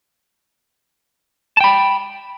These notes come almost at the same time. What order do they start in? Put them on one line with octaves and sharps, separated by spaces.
A5 G5 B5